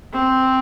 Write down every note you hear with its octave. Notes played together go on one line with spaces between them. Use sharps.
C4